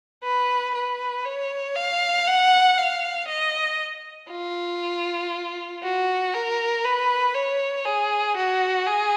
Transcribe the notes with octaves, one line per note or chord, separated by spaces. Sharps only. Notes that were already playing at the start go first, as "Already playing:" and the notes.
B4
B4
C#5
F5
F#5
F5
D#5
F4
F#4
A#4
B4
C#5
G#4
F#4
G#4